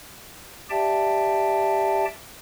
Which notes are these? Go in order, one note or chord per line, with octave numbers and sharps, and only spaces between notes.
G4 D5 E5 G5 A5